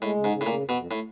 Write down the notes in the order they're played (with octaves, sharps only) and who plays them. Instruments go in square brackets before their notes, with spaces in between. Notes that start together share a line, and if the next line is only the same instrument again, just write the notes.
[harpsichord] A2 [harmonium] G#3
[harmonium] C#3
[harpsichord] G#2
[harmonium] C#3
[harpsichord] A2
[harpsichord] A#2 [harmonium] C#3
[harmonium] F2
[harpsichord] B2
[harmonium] F2
[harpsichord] A2